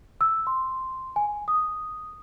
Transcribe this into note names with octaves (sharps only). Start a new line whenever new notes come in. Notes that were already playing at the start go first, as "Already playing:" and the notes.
E6
C6
G#5
D#6